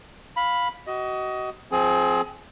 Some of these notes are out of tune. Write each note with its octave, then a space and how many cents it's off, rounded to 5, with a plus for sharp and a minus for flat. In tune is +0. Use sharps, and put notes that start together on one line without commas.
F5 +15 B5 +0
F#4 +30 D#5 +15
F3 +0 C4 +0 G#4 +25